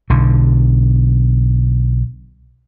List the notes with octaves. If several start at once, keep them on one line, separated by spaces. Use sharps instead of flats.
B1 D3